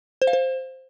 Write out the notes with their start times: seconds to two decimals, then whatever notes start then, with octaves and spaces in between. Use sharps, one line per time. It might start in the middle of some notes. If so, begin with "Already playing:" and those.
0.22 C5
0.27 F5
0.33 C5